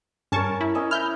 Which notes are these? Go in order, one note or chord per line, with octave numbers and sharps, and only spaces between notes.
G2 C#4 A#4 A5 C#6
E4
C#4 D#5 E6
E4 B5 F6 G6